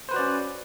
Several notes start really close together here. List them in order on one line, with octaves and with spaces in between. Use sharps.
C5 B4 F#4 D5 C#4